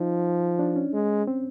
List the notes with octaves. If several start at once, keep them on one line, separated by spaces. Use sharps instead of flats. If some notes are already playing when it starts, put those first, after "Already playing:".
Already playing: F3 D#4
D4
C#4
G#3
C4